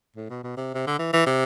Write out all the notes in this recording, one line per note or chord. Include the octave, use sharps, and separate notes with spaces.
A2
B2
B2
C3
C3
D3
E3
E3
C3